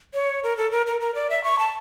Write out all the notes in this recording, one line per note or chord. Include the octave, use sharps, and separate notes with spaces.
C#5
A#4
A4
A#4
A#4
A#4
D5
E5
C#6
A5